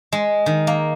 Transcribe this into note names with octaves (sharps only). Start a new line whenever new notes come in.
G#3
D#3
A#3